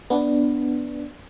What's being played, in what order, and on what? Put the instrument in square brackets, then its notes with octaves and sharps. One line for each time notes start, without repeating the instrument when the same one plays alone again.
[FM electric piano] B3 D4